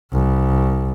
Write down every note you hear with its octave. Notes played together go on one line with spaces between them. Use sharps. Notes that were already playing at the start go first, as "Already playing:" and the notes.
C2